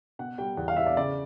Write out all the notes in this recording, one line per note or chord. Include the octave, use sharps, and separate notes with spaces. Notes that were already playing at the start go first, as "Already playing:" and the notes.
B2 F#5
G3 G5
E2 F#5
F5
E2 E5
D5
C#3 D5